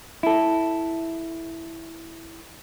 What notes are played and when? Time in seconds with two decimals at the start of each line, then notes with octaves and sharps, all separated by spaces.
0.23 E4 A4